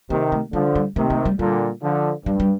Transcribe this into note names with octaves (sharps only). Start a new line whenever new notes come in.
C3 D#3 A#3
A3
D3 F3 G3
G3
C3 D#3 A3
A3
G3
A#2 D3 G3
D3 F3
G2 G3
G3